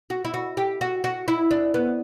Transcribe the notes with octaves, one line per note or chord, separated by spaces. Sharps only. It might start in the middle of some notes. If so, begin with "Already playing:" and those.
F#4
E4
F#4
G4
F#4
F#4
E4
D4
B3